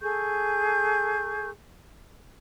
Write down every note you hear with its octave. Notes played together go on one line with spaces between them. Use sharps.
G#4 A4 C#6 G6